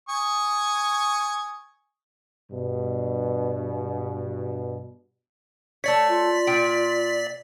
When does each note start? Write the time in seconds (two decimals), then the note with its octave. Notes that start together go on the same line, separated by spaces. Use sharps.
0.09 G#5 C#6 D#6
2.52 G2 B2
5.84 A3 C#5 D5 B6
6.09 F4
6.47 A#2 G5